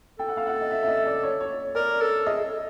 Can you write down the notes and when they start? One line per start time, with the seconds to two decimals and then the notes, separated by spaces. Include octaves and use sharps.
0.19 A4 G5
0.29 F#5
0.37 F5
0.47 F#5
0.62 D#5
0.71 E5
0.83 E5
0.88 D#5
1.06 D5
1.23 C#5
1.40 C#5
1.75 A#4 D5
2.01 A4
2.27 G#4 D#5
2.44 A4